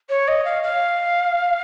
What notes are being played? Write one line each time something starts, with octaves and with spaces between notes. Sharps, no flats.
C#5
D#5
F5
F5